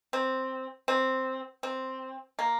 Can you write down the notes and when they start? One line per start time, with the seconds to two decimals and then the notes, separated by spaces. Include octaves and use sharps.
0.13 C4
0.88 C4
1.63 C4
2.39 A#3